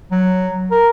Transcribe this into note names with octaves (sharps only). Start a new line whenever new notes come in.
F#3
A#4